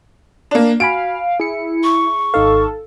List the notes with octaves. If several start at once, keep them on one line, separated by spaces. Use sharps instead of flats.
A#3 D4
F#4 F5 G#5 B5 D7
E4 G#4 C#7
C#6
G#1 D#4 A4 F5